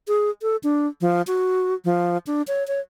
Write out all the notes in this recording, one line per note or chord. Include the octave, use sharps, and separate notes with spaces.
G#4
A4
D4
F3
F#4
F3
D4
C#5
C#5